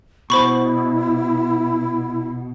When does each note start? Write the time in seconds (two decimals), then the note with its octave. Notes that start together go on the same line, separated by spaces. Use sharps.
0.30 B2 E4 C5 B5 C#6